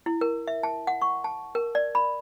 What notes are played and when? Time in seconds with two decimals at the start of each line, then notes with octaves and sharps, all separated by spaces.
0.06 E4
0.21 A#4
0.47 E5
0.63 A5
0.87 F#5
1.02 C#6
1.24 A5
1.55 A#4
1.75 D5
1.95 B5